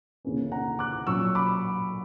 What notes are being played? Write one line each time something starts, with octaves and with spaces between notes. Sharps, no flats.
D2 C#3 E3 A#3 C#4
F#5 A#5
D6 F#6
A#2 F#3 C#4 C#6 E6
B5 D6